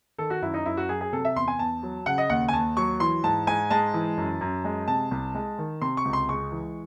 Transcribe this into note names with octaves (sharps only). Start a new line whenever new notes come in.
D#3 A4
F#4
F#2 E4
D#4
F#2 E4
F#4
F#3 G#4
G#4
C3 A4
E5
E2 C6
G#5
E2 A5
F#3
C#3 F#5
D#5
D#2 F#5
G#5
D#2 A5
F#3 C#6
E3 C6
G#2 A5
G#2 G#5
G#3 A5
E3
F#2
F#2
G#3
C3 A5
C2
G#3
D#3
C3 C6
C#6
C#2
C6
G#3 C#6
E3